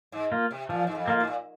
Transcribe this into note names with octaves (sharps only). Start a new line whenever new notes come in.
G#2
A#3 F4
C3
A#2 F3
G#2
F2
A#3 F4
G#2
A#2